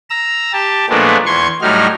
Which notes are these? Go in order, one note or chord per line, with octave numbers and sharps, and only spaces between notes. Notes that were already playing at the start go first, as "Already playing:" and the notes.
A#5 E6
G4 A5
A#2 F3 G#3 A3 B3 D4
E2 C6 C#6 G#6
A2 F#3 G3 D#4 F6